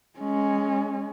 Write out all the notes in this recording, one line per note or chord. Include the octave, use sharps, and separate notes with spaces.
G#3 C#4